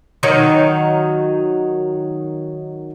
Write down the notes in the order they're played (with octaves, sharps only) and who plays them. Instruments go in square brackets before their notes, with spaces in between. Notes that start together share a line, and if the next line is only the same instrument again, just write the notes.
[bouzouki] D#3 F#3 D#4